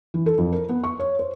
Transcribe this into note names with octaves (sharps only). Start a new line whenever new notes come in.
E3
A4
F2
A#4
B3
C#6
C#5
C5